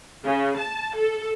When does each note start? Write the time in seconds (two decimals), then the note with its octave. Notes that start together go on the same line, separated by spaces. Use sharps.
0.25 C#3
0.57 A5
0.96 A4